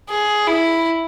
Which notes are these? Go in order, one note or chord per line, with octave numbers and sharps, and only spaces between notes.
G#4
E4